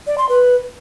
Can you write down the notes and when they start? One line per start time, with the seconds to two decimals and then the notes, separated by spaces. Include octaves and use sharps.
0.07 D5
0.18 C6
0.29 B4